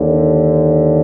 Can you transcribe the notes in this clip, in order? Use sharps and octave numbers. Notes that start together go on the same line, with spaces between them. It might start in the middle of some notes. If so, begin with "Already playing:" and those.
Already playing: D#2 D3